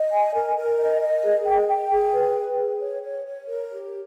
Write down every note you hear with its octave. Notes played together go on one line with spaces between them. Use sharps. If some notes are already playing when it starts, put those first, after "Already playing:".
Already playing: D#5
G#5
A#4
A#4
D#5
D#5
G#4
G5
G5
G#4
B4
B4
G#4
C#5
C#5
C#5
A#4
G4